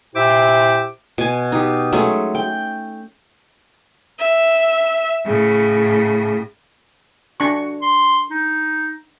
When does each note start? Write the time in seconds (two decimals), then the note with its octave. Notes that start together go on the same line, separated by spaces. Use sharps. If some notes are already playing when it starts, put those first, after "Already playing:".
0.15 A#2 E4 G4 C5 E5 D6
1.18 B2 G#5
1.52 D#4 G4
1.93 F#3 G#3 A3 C#4
2.35 G5
4.18 E5
5.24 A2 C#3
7.40 D4 F#4 C#6
7.82 C6
8.31 D#4